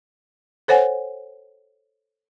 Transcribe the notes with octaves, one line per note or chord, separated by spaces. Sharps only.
A4 C5 C#5 F#5 G#5